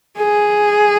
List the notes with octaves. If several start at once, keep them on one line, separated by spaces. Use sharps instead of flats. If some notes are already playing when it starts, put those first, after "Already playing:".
G#4